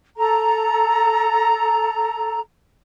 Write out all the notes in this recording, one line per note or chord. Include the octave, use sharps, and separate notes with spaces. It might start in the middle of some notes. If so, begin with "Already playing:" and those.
A4 A#5